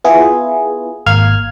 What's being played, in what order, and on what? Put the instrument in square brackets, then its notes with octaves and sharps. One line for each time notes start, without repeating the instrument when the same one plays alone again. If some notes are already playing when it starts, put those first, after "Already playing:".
[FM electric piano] B3 E4 F4 G#4
G#1 A#3 F5 F6 G#6